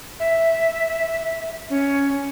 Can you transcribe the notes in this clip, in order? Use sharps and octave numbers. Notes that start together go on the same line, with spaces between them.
E5
C#4